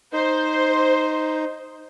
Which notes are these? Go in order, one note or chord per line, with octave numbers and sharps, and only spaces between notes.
D#4 C5